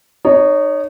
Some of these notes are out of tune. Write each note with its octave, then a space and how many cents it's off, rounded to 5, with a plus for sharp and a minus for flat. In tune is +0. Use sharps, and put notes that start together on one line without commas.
D#4 -25 C#5 +10